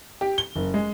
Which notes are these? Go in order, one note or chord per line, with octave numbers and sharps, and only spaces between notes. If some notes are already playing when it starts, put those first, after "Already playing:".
G4
G7
F#1
G#3